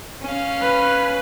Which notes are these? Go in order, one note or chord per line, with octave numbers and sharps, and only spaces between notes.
C#4 F5
B4